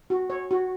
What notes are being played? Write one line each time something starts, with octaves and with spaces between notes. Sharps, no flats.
F#4
C#5
F#4